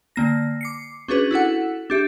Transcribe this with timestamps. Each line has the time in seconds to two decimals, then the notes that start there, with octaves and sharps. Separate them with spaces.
0.16 D3 A#3 A#6
0.61 D6 C7 C#7
1.08 C#4 D4 F#4 G#4 B4
1.31 E4 F#4 A4 F#5
1.90 D4 G4 E5